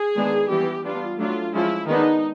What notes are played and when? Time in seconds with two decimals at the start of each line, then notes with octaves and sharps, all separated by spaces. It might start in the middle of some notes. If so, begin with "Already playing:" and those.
Already playing: G#4
0.15 D#3 G#3 B3 D4
0.49 E3 G3 B3 G4
0.84 G3 B3 D4 F4
1.18 F#3 A3 D4 F4
1.53 F3 G#3 C#4 E4
1.87 D#3 G#3 B3 D4 D#4